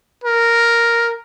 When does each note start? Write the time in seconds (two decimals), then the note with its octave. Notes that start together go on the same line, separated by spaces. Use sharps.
0.24 A#4